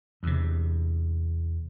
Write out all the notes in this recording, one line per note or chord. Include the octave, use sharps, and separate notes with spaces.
E2 C3